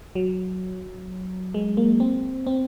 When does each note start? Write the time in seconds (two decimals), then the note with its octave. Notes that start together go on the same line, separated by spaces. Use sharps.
0.15 F#3
1.54 G#3
1.77 A#3
2.00 C4
2.47 C4